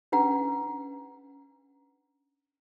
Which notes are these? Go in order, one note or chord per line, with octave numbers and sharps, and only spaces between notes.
C#4 D4 B4 F#5 A#5